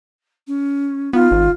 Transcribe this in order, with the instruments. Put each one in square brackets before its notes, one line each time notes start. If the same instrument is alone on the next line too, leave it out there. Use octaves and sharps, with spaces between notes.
[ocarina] C#4
[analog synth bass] B3 [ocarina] D#4 [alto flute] F4
[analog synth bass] G#1